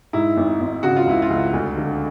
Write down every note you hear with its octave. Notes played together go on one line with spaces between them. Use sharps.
G#2 E4
G#1
G#1
C#3 F#4
F4
C#2 E4
F4
C#2
D2
D3